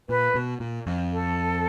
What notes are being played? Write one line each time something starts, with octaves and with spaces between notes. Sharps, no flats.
A#2 B4
B2
A#2
F2
A4